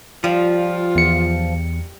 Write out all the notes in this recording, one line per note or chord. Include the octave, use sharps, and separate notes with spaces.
F3 G3 F4
E2 C#7